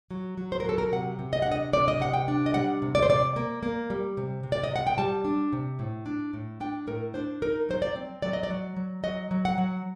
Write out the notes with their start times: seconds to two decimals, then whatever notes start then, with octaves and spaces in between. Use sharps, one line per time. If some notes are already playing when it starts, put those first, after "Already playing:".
0.11 F#3
0.37 F#3
0.52 C5
0.60 A#4
0.65 F#3 A4
0.78 A#4
0.92 C3 F#5
1.19 C3
1.33 D#5
1.42 F#5
1.47 D4 D#5
1.73 C3 D5
1.88 D#5
2.00 C3 F#5
2.14 G5
2.28 D4
2.46 D#5
2.54 G3 F#5
2.82 C3
2.95 D5
3.03 C5
3.09 C3 D5
3.36 A#3
3.63 A#3
3.90 G3
4.17 C3
4.43 C3
4.52 D5
4.64 D#5
4.71 C3 F#5
4.87 G5
4.98 G3 A5
5.25 D4
5.53 C3
5.79 A2
6.06 D4
6.33 A2
6.60 D4 G5
6.87 A2 A#4
7.14 D4 C5
7.42 D#4 A#4
7.69 F#3 C5
7.82 D5
7.96 C4
8.22 F#3 D5
8.33 D#5
8.43 D5
8.50 F#3
8.76 F#3
9.04 F#3 D#5
9.31 F#3
9.45 F#5
9.58 F#3